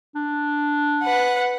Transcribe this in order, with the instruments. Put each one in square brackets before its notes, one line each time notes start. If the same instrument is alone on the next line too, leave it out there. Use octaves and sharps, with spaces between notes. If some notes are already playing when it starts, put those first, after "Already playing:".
[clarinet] D4
[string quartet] B4 F#5